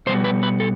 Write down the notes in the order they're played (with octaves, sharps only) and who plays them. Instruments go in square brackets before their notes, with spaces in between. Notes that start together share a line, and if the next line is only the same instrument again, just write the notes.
[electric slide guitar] B2 G3 B3 C5
B4
B4
A4